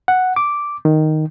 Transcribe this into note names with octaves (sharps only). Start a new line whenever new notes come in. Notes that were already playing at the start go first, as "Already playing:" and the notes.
F#5
D6
D#3